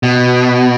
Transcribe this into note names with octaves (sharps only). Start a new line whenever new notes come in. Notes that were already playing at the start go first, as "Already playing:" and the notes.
B2